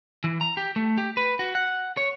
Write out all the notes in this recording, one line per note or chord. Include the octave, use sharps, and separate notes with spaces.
E3
A#5
G4
A3
G4
B4
F#4
F#5
C#5